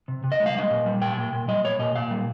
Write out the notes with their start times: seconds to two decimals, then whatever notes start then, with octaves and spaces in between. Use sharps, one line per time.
0.08 C3
0.24 C3
0.32 D#5
0.40 G#3
0.46 F5
0.55 G3 D#5
0.70 A#2
0.86 G3
1.01 A#2 G5
1.17 A#2
1.33 A#2
1.48 G3 D#5
1.64 A#2 C#5
1.79 A#2 D#5
1.96 A#2 F5
2.11 G3